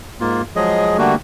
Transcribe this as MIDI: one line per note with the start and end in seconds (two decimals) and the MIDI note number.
0.20 0.42 44
0.20 0.42 58
0.20 0.42 65
0.56 0.97 53
0.56 0.97 54
0.56 0.97 56
0.56 0.97 68
0.56 0.97 75
0.98 1.15 50
0.98 1.15 55
0.98 1.15 57
0.98 1.15 58
0.98 1.15 66